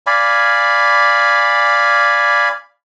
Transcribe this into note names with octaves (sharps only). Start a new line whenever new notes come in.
D5 F5 G#5 B5